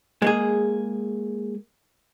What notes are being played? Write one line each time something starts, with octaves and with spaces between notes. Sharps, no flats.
G#3 A#3 G#4